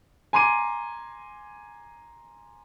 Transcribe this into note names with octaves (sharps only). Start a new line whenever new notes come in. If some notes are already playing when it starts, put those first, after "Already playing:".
G#5 A#5 C6 D6 D#7